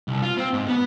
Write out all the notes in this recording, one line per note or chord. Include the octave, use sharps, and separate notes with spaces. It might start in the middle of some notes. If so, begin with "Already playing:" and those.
C2
F4
C4
G#2
B3